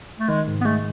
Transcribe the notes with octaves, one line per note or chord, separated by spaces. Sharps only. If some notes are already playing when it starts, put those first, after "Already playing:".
A3
D#3 G#3
G#2
B3
G#3 A3